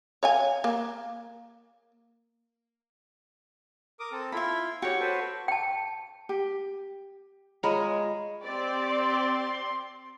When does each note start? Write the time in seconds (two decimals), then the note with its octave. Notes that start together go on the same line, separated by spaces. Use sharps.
0.23 C#5 F5 G#5
0.64 A#3
4.00 A#4 D6 D#6
4.12 C4 A4
4.32 E4 F4 E5 B5
4.82 F#4 G4 C#5 G5
5.00 A4 B4 C5
5.48 G5 A5
6.29 G4
7.63 G#3 F4 C#5 A#5 B5
8.43 C4 G4 D5
8.86 C6